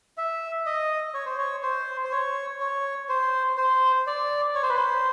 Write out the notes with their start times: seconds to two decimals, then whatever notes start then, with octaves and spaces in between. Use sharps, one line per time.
0.18 E5
0.66 D#5
1.14 C#5
1.25 C5
1.38 C#5
1.63 C5
2.04 C5
2.12 C#5
2.60 C#5
3.09 C5
3.57 C5
4.07 D5
4.55 C#5
4.63 C5
4.69 B4
4.77 C5